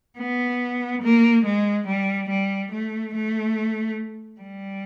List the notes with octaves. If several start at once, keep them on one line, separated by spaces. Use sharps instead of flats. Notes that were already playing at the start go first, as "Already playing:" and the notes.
B3
A#3
G#3
G3
G3
A3
A3
G3